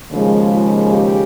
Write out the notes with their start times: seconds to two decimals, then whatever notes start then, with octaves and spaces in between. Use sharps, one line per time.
0.12 D#2 C#3 F3 G#3
0.51 F4
0.92 G4